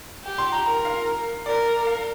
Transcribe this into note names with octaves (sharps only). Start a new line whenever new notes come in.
G4
C6
A#5
A#4 A#5
F5
A#4 D5
F5